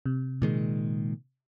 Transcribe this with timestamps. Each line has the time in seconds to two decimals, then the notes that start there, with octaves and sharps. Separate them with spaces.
0.06 C3
0.42 A#2 D#3 G#3